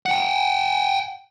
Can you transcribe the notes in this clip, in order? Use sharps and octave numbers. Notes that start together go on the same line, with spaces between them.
F#5 G5